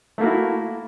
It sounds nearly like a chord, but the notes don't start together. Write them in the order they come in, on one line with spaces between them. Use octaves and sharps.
A3 A#3 F#4 E4